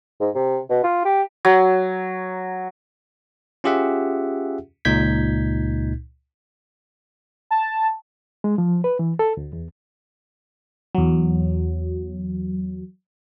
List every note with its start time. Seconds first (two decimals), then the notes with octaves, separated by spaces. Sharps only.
0.20 G#2
0.35 C3
0.70 B2
0.84 F4
1.05 G4
1.45 F#3
3.64 C#4 F4 G4 G#4 E5 F#5
4.85 C#2 A#2 D#4 G6 G#6 B6
7.51 A5
8.44 G#3
8.58 F3
8.84 B4
8.99 E3
9.19 A4
9.37 D2
9.53 E2
10.95 E2 F#3